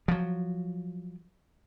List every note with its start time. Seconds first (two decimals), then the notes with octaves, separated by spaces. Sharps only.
0.08 F3 F#3